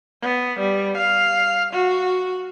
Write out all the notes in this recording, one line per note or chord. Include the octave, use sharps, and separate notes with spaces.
B3
G3
F5
F#4